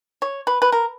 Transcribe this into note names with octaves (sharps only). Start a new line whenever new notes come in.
C#5
B4
B4
A#4